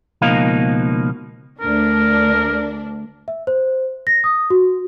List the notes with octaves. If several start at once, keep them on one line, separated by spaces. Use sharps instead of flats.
C#2 B2 F3 A#3 D#4 F5
D2 D4 A#4
E5
C5
A#6
D#6
F#4